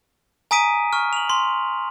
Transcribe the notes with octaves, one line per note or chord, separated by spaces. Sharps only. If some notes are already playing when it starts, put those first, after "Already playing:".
G#5 A#5 D#6 B6 D7 D#7
C#6 F6
F7 F#7
C6